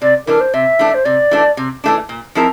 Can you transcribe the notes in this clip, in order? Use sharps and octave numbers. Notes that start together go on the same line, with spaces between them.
C3 D5
E3 A3 D4 A#4
C5
C3 E5
E3 A3 D4
C5
C3 D5
E3 A3 D4
C3
E3 A3 D4
A#2
F3 C4 E4 A#4